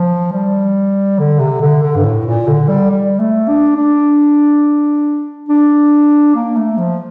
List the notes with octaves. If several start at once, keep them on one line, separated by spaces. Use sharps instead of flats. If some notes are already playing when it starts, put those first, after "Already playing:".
Already playing: F3
G3
D3
C3
D3
D3
G2
A2
A#2
D3
G3
G3
A3
D4
D4
D4
A#3
A3
F3